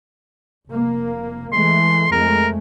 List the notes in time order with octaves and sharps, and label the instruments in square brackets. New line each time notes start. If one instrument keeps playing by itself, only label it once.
[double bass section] F1 A#3
[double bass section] E3 G#3 A3 [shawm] C6
[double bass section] F2 G#3 A3 [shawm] A#4